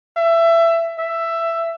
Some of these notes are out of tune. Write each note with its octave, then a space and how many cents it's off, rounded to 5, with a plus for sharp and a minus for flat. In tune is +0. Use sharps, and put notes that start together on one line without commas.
E5 +20
E5 +10